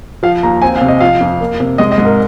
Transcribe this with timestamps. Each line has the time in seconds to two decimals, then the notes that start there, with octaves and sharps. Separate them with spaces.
0.23 F3 F5
0.43 D#2 A#5
0.62 C4 G#5
0.76 F5
0.81 C3
0.88 D#5
1.00 F3 F5
1.21 F2
1.40 A#3
1.60 C3
1.78 G#3 D#5
1.92 D#5
1.98 G#2
2.05 A#4